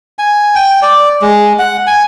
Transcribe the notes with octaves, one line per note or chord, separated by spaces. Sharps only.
G#5
G5
D5
G#3
F#5
G#5